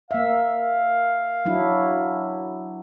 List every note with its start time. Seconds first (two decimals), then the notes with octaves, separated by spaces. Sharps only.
0.11 A#3 E5 F5
1.45 F#3 D4 E4